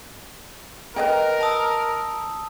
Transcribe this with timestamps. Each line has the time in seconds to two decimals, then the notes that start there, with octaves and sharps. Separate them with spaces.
0.96 A#4 B4 D#5 G5
1.41 A5 D#6 E6